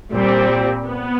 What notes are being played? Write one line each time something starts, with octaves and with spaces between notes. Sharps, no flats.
A#2 G3 C4
B3